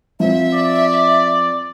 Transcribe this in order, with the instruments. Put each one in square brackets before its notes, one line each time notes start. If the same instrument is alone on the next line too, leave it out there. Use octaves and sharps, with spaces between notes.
[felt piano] F3 C4 [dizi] E5
[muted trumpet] D5